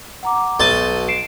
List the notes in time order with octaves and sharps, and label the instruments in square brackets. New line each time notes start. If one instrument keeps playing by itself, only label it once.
[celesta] F#5 A#5 D6
[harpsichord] B1 A5 [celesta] D#7 G7
[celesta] C7 D7 E7